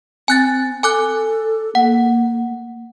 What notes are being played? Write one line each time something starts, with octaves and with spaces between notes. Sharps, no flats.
C4 G#5 F#6 A6
A4 G#5 D6 F#6
A#3 F#5